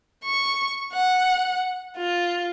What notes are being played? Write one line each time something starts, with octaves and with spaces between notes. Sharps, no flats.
C#6
F#5
F4